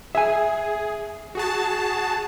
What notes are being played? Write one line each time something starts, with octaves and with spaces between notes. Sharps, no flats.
G#4 E5 G#5
F#4 G#4 A5